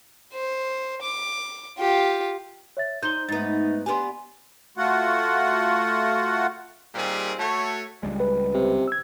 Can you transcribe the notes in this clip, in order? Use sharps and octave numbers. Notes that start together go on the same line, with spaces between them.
C5
D6
F4 G4
C#5 E5 A6
D#4 C5 G6 G7
G#2 G#3 A3 B3 D#4 A6
B3 D4 G4 G#5 C6
A3 F4 F#4 F#5
A#2 D#3 G3 C4 G4 G#4
A3 F#4 C#5
C#2 G3 G#3
B4
C3
E6 G#6